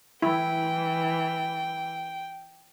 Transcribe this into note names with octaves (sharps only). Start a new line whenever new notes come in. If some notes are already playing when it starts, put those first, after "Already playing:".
E3 E4 G5